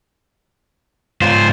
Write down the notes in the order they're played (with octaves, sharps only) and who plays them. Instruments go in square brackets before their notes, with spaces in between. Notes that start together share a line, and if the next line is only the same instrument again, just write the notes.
[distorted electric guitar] G#2 F4 [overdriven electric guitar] C5